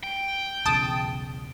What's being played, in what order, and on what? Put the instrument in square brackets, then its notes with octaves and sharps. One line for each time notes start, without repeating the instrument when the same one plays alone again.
[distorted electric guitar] G5
[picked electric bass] B1 E2 C#3 [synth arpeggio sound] A5 D#6